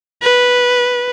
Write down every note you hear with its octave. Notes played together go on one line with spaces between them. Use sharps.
B4